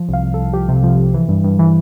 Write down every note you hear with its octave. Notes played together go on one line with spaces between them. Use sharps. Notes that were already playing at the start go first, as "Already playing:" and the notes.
Already playing: F3
C2 F5
C2
A4
C2
F3 G4
C3
F3
C3
E3
G2
G2
E3